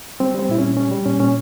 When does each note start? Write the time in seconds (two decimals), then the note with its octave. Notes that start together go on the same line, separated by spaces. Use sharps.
0.20 G3 C4
0.34 G3 C4
0.49 A#2 E4
0.58 C#4
0.64 A#2
0.77 G3 C#4
0.91 G3
1.06 A#2 C#4
1.20 A#2 C#4